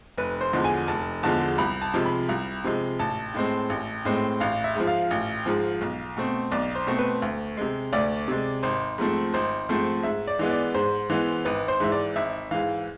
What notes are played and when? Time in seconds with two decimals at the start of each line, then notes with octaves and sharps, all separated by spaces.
0.18 F1 B4
0.41 C5
0.53 E2 D3 F3 G#3
0.64 G#5
0.88 F1 A5
1.23 E2 D3 F3 G#3 A5
1.58 C2 B5
1.82 A5
1.94 C3 F3 G#3
2.06 B5
2.29 C2
2.64 C3 F3 G#3
2.99 A1 A5
3.34 A2 G#3 C4
3.70 A1
4.05 A2 G#3 C4
4.40 A1 F5
4.64 E5
4.75 G#2 F3
4.87 F5
5.11 A1
5.46 G#2 F3
5.81 B1
6.17 B2 A3 C4
6.52 B1 D5
6.75 C5
6.87 B2 A3 C4
6.99 B4
7.22 D2
7.57 C3 G#3
7.93 D2 D5
8.28 C3 G#3
8.63 G#1 C5
8.98 G#2 F3 A3 C4
9.34 G#1 C5
9.69 G#2 F3 A3 C4
10.03 G#2 E5
10.27 D5
10.39 E3 G#3 B3
10.51 D5
10.75 G#2 C5
11.10 E3 G#3 B3
11.45 G#1 B4
11.68 C5
11.80 G#2 E3 E5
11.92 D5
12.16 G#1 E5
12.51 G#2 E3 F5